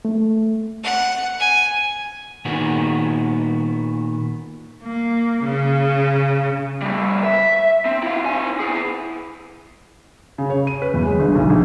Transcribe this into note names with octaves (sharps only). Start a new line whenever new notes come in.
A3
F#5
G#5
A#2 D#3 B3 F#4 G#4
A#3
C#3
G3 A3
E5
C4
E4 F5
C4 G#5
E4 G#4
C#3
C#5
D#7
B4
E2
G#3
G1
B1
A#1